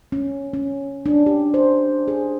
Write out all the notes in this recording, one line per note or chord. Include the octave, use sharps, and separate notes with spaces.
C#4
C#4
D4
G4
C5
G#4